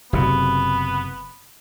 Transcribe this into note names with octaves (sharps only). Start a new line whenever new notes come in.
F#1 C3 B3